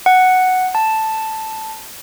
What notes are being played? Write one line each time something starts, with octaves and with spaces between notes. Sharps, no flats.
F#5
A5